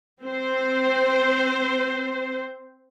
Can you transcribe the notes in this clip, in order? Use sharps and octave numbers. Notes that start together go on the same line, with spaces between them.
C4 C5